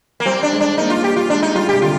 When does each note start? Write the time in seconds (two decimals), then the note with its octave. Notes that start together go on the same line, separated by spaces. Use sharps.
0.20 A#3
0.25 G3 C4
0.43 D4
0.52 G#3
0.61 D4
0.77 A#3 D#4
0.90 F4
1.04 G4
1.16 F4
1.30 G#3 D4
1.42 D#4
1.55 G3 F4
1.69 C3 G4
1.81 D3 F4